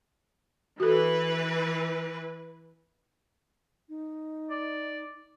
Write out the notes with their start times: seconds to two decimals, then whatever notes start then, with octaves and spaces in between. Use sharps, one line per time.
0.80 E3 F#4 A4 B4
3.89 D#4
4.50 D5